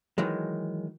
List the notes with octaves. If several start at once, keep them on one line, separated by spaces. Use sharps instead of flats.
D#3 E3 F#3 G#3